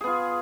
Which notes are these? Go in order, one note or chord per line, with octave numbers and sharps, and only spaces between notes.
B3 F4 G#4